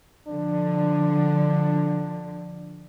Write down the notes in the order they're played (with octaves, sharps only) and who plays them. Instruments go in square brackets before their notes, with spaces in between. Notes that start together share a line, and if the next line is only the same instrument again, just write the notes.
[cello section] D3 F3 [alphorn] D4